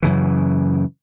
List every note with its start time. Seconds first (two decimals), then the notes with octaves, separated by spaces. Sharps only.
0.03 F#2 C#3 E3